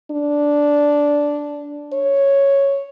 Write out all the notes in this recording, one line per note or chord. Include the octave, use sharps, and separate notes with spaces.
D4
C#5